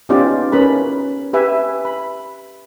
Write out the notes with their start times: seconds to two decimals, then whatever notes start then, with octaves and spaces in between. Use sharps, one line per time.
0.09 B3 C#4 D#4 F4 G4 D5
0.52 C#4 A#4 B4 B5
1.33 G4 B4 E5 G#5
1.85 B5